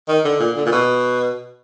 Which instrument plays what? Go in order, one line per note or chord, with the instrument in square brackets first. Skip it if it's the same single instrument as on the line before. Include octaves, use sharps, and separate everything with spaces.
[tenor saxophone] D#3
D3
A#2
D3
A#2
B2